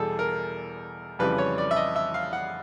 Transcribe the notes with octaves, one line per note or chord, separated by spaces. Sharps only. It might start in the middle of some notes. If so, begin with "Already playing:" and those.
Already playing: E2 B2 G3 G#4 A4
A#4
F2 C#3 E3 G3 B4
C#5
D5
E5
D#5
E5
F5
F#5